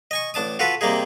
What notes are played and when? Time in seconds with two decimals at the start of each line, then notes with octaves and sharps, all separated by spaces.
0.11 D#5 G#5 C#6
0.34 A1 D4 A5 D#6
0.59 F4 F#4 A4 B4
0.81 C3 G3 A#3 D#4 G#4